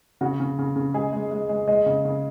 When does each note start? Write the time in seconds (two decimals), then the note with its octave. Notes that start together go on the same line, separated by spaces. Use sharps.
0.21 C#3 F#4
0.40 C#3
0.58 C#3
0.76 C#3
0.94 G#3 G#4
1.13 G#3
1.31 G#3
1.49 G#3
1.68 G#3 D#5
1.86 C#3
2.05 C#3